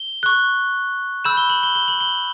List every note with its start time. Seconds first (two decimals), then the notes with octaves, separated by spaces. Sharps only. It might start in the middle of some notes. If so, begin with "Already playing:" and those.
Already playing: G7
0.23 C#6 F#6
1.25 B5 E6 G6 E7
1.37 G7
1.50 F#7
1.63 G7
1.75 G7
1.88 F#7
2.01 G7